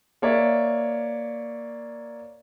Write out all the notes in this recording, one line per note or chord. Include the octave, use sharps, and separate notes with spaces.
A#3 C#5 D5 E5